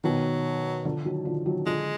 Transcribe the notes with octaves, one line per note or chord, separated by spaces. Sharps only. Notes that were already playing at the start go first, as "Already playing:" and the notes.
B2 D#3 F#3
D3 F3
D#3 F#3
D3 F3
D#3 F#3
D3 F3 G#3